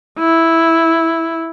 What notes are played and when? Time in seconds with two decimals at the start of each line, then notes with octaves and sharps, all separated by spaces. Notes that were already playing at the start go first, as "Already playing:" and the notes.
0.19 E4